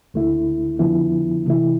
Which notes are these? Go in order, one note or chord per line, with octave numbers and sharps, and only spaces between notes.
D2 D3 A3 E4
F2 D3 F3 B3 E4
C3 E3 A3 E4